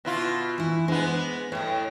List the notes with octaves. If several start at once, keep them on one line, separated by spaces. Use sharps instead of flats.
B2 E4 F4
E3 E4
G#3 B3 D4 C5
A2 C#5 D#5